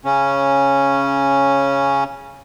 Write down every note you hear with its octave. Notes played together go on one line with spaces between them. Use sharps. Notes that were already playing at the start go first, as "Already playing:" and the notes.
C#3 C#4